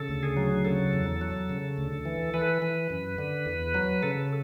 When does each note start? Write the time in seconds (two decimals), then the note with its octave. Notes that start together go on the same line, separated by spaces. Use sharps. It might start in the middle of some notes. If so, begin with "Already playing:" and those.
Already playing: C#3 A4
0.09 D2
0.23 G#4
0.37 F#3
0.65 C#3 A4
0.93 E2
1.21 F#3
1.49 C#3
1.77 D2
2.05 E3
2.34 E3 B4
2.62 E3
2.90 F#2
3.18 D3
3.46 E2
3.74 F#3
4.03 C#3 A4